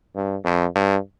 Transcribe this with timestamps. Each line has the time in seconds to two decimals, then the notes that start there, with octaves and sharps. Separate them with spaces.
0.15 G2
0.44 F2
0.75 G2